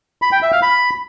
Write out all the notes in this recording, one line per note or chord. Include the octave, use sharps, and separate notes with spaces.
B5
G5
E5
F5
B5